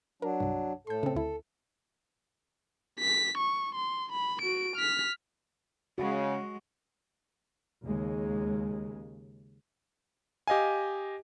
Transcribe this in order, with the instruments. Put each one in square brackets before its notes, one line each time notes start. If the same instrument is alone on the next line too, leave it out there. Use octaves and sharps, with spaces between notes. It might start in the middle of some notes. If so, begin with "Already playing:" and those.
[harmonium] F#3 D4 [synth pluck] A#4
[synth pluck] C2 G2
[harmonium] A2 A4 [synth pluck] C6 G6
[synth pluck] C#3 C4
[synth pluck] D2 E4 [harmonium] A4
[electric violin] B6
C#6
C6
B5
F#4 D7
F6 B6
[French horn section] C#3 [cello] G#3 [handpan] F#4
[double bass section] D#2 C#3 G#3
[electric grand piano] G4 D#5 F5 G#5